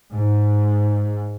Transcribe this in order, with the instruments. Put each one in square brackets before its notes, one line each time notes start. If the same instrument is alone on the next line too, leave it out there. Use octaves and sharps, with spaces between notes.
[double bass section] G#2